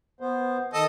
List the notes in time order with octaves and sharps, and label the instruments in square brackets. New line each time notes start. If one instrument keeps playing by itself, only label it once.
[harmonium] B3 C5
[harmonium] D#3 [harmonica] A4 D#5